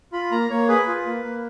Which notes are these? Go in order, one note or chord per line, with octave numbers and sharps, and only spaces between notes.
F4 B5
A#3 A#5
A#3 C#5
G#4 B4
F4
A#3
A#3